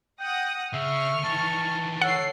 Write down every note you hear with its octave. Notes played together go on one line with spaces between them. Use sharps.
F#5 G5 D#6 A#6
C#3 E5 C#6 F6
D#3 E3 A5
A4 C#5 F#5 C7